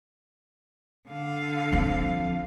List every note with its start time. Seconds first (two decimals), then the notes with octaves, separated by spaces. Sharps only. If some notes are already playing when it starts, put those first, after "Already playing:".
1.08 D3 F5
1.72 F3 C4